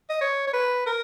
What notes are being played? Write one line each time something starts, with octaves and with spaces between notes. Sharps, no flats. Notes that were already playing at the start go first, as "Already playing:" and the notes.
D#5
C#5
C#5
B4
A#4